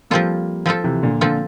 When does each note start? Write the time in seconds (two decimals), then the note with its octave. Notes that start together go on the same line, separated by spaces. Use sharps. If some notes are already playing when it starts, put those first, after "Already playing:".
0.10 F3 G3 A#3 C4 F4 A4
0.66 F3 C4 F4 A4
0.84 C3 E3
1.03 A#2 D3
1.21 A#2 D3 F3 C4 F4 A4